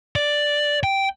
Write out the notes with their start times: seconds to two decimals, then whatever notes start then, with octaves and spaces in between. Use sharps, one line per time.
0.16 D5
0.83 G5